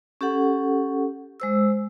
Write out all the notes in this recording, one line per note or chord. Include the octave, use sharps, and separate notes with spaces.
C#4 G4 A4 F#5
G#3 C5 E6